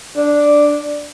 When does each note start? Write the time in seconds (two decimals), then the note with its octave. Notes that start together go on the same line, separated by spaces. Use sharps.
0.17 D4